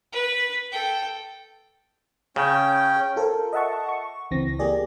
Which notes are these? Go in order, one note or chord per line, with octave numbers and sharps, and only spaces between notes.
B4
A4 G5
C#3 C#4 G5
F4 A4 A#4 C5
D#5 E5 F#5 A5 C#6
C#6
C#2 E3 C4 A#6
A#3 G4 G#4 D5